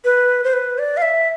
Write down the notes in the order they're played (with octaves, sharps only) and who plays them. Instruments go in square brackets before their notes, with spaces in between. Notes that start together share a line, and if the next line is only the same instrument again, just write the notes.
[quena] B4
C5
B4
D5
F5
E5